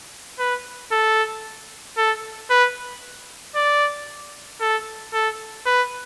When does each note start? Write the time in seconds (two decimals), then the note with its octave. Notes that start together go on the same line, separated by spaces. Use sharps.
0.39 B4
0.91 A4
1.97 A4
2.50 B4
3.55 D5
4.61 A4
5.13 A4
5.66 B4